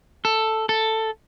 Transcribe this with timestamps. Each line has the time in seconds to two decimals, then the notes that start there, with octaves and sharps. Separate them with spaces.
0.25 A4
0.69 A4